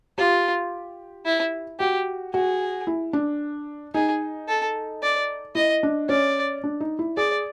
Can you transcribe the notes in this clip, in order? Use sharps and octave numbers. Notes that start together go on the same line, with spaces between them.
F4 G4
E4
F#4 G4
F#4 G#4
E4
D4
D#4 G#4
A4
D5
E4 D#5
D4
C#4 D5
D4
D#4
E4
G#4 D5